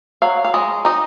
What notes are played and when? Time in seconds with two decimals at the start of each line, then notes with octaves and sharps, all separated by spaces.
0.22 F#3 F5
0.44 F5
0.54 G#3 D#5
0.85 D#4 D#5